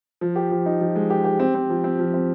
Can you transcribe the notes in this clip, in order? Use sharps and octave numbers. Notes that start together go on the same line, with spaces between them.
F3
G4
F3
D#4
F3
G#3
G4
G4
C4
C4
F3
C4
F3
C4